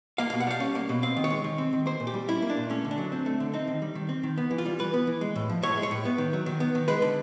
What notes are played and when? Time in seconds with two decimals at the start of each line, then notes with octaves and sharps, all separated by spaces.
0.18 A#3 F5
0.30 F5
0.33 B2
0.40 F#5
0.47 G3 F5
0.60 C#4
0.75 A#3
0.89 B2
1.03 C4 F5
1.17 D#3
1.24 C#5
1.30 G#3
1.44 D#3
1.58 C4
1.73 D#3
1.86 A#3 C5
2.00 A#2
2.07 G4
2.14 G3
2.28 C#4 E4
2.42 A#3
2.50 D4
2.56 A#2
2.70 A3 C#4
2.84 D3
2.91 D4
2.98 F#3
3.12 C4
3.26 A3
3.40 D3
3.53 C4 D#4
3.67 D#3
3.82 G3
3.95 D#3
4.09 C4
4.23 D#3
4.38 B3
4.51 E3
4.58 F4
4.66 G3
4.79 E3 B4
4.94 B3
5.07 E3
5.21 G#3
5.36 A2
5.49 F3
5.63 A2 C#5
5.77 G#3
5.83 C#5
5.91 A2
6.05 B3
6.18 D#3
6.33 F#3
6.46 D#3
6.60 B3
6.75 D#3
6.88 G#3 B4
7.02 D3